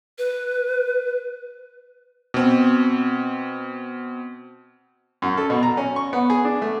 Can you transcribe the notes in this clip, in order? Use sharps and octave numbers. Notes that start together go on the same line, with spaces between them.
B4
B2 C4
F#2
A4
B2
A#5
C#4
C#6
B3
G#4
D4
A3